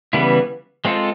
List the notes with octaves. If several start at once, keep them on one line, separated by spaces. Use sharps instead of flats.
C#3 E3 G3 B3 E4
G#3 C4 F4 A4